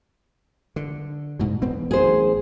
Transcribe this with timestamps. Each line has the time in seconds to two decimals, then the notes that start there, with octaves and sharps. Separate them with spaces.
0.76 D3
1.39 C2 G#2 B2
1.62 E1 B3 C4
1.91 A1 G#4 C5